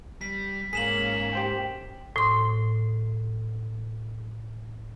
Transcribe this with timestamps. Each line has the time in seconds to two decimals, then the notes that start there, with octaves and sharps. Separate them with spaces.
0.21 G3 B6
0.73 G#2 A#3 C#4 G#4 B6 E7 F#7
1.33 G4 C5 G5
2.16 A2 C6